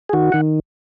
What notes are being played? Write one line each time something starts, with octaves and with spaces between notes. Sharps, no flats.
G#4
D#3 F#4
D#3 F#5